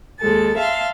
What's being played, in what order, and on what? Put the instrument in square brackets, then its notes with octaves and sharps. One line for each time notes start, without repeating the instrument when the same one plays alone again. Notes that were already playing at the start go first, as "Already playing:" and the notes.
[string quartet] D#2 G#3 A4 A6
E5 F5 A5 C6